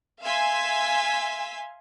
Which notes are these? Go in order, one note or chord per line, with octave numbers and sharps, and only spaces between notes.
E5 F5 G#5 C6 E6 B6